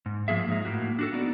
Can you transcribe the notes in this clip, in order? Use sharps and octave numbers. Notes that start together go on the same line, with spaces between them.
G#2
F3 A#3 G#4 E5
G#2 D#4
A2 A#3 F#4
D4 F#4 A4
B3 D#4 F#4 D5